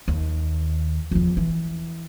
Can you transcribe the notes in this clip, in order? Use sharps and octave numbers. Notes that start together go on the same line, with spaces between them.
D#2
E2 F3
E3